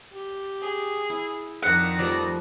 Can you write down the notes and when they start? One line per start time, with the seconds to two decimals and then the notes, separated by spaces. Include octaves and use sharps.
0.13 G4
0.62 G#4
1.10 E4
1.63 F2 D#3 D4 F#5 A#6
1.99 F3 G3 A3 D5